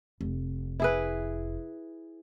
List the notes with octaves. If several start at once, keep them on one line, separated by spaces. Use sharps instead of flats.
F1
E4 G#4 B4